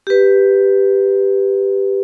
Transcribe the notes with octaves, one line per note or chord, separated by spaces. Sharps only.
G4 B4